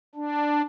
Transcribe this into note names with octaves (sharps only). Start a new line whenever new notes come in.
D4